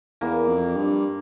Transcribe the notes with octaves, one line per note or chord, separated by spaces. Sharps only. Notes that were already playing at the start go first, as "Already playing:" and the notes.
E2 A#3
F2
G2